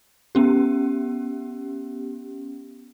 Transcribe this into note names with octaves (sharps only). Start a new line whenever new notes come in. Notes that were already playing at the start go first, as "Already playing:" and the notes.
B3 C#4 G4